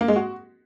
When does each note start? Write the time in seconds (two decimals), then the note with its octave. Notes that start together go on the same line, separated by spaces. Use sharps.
0.01 A#3
0.08 G#3
0.16 F#4